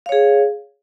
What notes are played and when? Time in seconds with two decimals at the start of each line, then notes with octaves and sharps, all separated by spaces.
0.06 F5
0.09 C#5
0.12 G#4